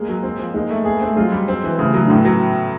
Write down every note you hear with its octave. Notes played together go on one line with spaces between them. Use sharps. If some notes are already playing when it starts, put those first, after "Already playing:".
Already playing: G#3 A#3
F#3
C4
F3
G#3 A#3 D#4
A3
B3 G#4
A#3
A3 C4
F#3 G#3 F4
G3
C4
E3
C#3 G3 A3
F#3 A3 B3
D4
A2 B3 C#4
F#3